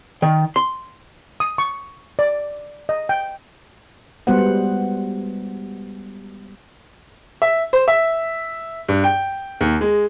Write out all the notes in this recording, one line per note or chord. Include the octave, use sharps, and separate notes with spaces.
D#3
C6
D#6
C#6
D5
D#5
G5
G3 G#3 B3 F#4 C5 F#5
E5
C5
E5
G2
G5
D#2
G#3